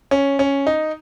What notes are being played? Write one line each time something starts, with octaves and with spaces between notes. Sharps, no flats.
C#4
C#4
D#4